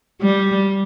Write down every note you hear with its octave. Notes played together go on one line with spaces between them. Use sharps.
G3